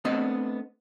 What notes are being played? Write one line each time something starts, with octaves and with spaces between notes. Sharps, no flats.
A3 B3 C4 D4 D#5 F#5